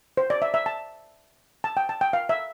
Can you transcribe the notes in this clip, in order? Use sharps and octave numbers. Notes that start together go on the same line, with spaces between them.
C5
D5
E5
E5
A5
A5
G5
A5
G5
F5
E5